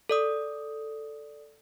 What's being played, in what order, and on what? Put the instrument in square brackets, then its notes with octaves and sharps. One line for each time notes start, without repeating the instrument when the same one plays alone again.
[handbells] A4 D5 D#6